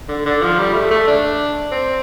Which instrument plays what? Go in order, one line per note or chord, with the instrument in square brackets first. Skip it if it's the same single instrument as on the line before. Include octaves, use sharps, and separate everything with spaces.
[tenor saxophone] D3
D3
F3
G3
A3
A3
D4
C4